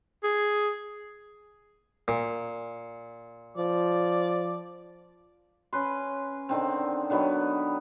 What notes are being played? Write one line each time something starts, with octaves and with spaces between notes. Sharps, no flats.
G#4
A#2
F3 D5
C#4 B4 C6
D3 D#3 C4
D3 D#3 F#3 B3